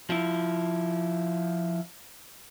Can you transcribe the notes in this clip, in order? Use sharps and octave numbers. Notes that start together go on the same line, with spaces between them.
F3 E4